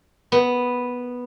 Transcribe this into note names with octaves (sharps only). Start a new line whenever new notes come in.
B3